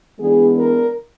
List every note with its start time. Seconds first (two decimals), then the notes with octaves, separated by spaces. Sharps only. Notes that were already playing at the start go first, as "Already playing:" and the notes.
0.19 E3 G#3 B3 D4 G#4
0.59 A#4